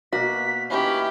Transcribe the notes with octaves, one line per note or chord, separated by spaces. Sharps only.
B2 A#3 F#4 B6
E3 C#4 D#4 G4 B5